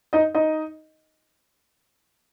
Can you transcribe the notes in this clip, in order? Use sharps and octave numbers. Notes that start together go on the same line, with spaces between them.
D#4 D#5
D#4 D#5